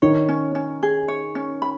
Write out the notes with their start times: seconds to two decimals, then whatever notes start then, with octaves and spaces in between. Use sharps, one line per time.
0.02 D#3 C#5
0.29 C#4
0.55 C#4
0.83 G#4
1.08 C#5
1.35 C#4
1.62 B5